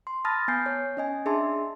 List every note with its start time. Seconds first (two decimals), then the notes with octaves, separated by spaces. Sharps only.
0.07 C6
0.25 A5 B5 D#6 F6 A6 A#6
0.48 B3 G#5 G6 C7
0.66 C#5
0.97 C#4 D#5 G#5
1.26 D4 G#4 E5 A5 C6